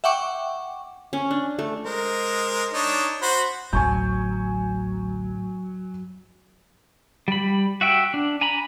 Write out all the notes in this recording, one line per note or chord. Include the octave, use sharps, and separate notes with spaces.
E5 F#5 G5 C#6 D6
C#4
D4
A3
G#3 A#4 C5
D4 D#4 C#5
F#4 C5 B5
A1 D2 F#3 G#5 C#6 G6
G3 B5
F#4 E5 G5
D4
G#5 A#5 B5